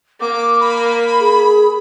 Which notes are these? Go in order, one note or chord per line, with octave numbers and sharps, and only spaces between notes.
A#3 D6
B5
G#4